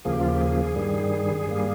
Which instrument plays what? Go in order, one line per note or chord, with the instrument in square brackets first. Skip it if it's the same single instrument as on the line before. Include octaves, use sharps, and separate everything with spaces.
[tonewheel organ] D#2 C#3 F3 A#3 G#4
G4
F4
G4
G#4
G2 D#3 G3
G2 G3 A#3